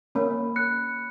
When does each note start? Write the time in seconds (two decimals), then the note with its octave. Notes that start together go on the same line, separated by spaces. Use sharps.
0.15 A#3 C#4 B5
0.56 F#6 C#7